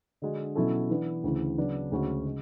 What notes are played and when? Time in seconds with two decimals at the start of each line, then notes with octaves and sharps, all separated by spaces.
0.22 D3 G#3 D4 F#4
0.56 B2 F#3 C#4 E4 A4
0.90 E3 B3 D4
1.24 D2 C#3 E3
1.58 C#3 F#3 B3 D4
1.92 D2 C#3 G#3 C#4 F#4
2.25 C#3 G#3